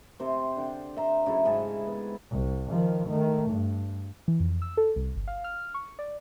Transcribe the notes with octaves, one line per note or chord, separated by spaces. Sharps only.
C3 C5
D3 G5
E5 A#5 C6
C#3 F#3 E4 A4
G#2 C#3 A4 G#5
B3
C2
D#3 F3
D#3 A3
G2
E3
F2
E6
A4
C2
G1
F5
F6
C#6
D5